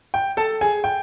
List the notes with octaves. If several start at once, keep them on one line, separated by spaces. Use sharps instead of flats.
G5
A4 A5
G#4 G#5
G5